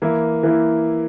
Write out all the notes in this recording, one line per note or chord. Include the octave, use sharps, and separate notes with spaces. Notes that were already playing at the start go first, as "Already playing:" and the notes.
E3 A#3 E4
E3 A#3 E4